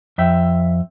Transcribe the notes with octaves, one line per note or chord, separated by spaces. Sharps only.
F2 E5 G5